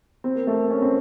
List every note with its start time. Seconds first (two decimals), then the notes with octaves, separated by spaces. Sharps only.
0.24 C4
0.35 A#3
0.47 A3
0.70 C#4
0.82 C4